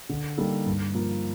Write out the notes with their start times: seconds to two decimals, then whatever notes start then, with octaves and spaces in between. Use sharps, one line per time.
0.09 D3
0.38 G3 A#3 D#4 A4
0.66 G2
0.95 F3 A#3